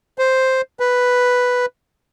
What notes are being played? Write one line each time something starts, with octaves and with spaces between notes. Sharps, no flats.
C5
B4